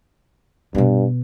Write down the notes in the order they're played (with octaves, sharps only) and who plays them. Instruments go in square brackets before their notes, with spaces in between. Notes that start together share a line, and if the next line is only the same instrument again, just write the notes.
[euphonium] G2 [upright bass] B2 B3